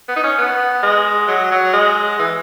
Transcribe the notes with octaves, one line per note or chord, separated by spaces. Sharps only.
B3
D#4
C#4
B3
G#3
F#3
F#3
G#3
E3